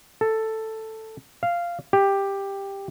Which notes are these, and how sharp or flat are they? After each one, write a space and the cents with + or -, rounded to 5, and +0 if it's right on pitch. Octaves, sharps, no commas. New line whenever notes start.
A4 +5
F5 -10
G4 +10